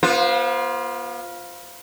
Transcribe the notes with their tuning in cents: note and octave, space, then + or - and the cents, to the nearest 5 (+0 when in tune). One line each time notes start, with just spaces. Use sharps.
B3 -40 F4 +0 C5 +0